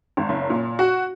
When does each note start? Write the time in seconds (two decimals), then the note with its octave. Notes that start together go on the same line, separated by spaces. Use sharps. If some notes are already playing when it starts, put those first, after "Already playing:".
0.17 G#1
0.29 F#1
0.50 A#2
0.79 F#4